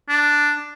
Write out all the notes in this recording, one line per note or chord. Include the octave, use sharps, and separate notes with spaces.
D4